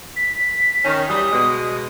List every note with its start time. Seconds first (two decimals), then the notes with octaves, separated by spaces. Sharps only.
0.16 B6
0.85 D#3 C#4
1.09 E3 F#3 G3 D#6
1.32 B2 G#3